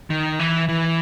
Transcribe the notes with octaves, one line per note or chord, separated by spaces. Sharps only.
D#3
E3
E3